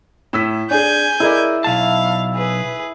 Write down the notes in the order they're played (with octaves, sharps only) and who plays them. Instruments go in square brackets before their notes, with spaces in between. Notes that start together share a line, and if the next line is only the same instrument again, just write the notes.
[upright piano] A2 E6 B6
[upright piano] D4 G#4 [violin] G#5 G6
[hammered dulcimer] E4 [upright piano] G#4 A#4 D5
[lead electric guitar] B1 A5 [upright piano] E5 [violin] F5
[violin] G#4 B4